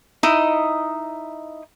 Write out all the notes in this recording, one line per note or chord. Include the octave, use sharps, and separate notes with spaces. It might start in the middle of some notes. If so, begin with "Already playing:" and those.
D#4 E4 D#5